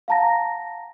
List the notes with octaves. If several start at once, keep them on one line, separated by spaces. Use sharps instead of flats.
F5 F#5 A5 A#5 A#6